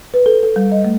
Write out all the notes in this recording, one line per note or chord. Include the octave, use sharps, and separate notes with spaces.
B4
A4
A4
G3
D#5
A3